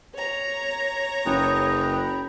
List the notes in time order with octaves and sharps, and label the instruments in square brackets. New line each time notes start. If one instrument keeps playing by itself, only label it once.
[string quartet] C#5 A#5
[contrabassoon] F#1 [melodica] G#4 B4 G5
[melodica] G5 B5